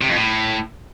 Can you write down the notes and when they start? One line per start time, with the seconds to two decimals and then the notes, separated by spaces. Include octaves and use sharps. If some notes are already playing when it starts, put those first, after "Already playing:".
0.01 C3
0.08 F2
0.15 A2